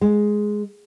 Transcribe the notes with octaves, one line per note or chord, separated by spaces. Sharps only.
G#3